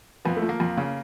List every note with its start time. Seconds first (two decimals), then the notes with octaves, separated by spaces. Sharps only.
0.25 F2 B3
0.36 A3
0.42 F3
0.49 A#3
0.60 F2
0.77 C#3